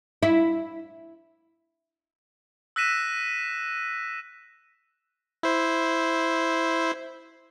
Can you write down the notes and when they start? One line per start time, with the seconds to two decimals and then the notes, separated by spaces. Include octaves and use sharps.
0.23 E4
2.76 E6 F#6 A#6 B6 D#7 E7
5.43 E4 C5